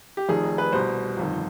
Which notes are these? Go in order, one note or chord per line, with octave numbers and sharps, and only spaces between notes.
G4
F1 F2 D#3 G#4
B4
C2 B2 C5
G1 F2 D#3